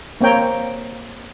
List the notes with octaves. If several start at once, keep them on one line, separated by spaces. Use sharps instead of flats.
A#3 C4 C#5 G5 A#5